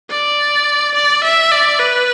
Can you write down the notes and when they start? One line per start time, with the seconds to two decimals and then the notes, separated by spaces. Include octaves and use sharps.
0.10 D5
0.95 D5
1.24 E5
1.52 D5
1.80 B4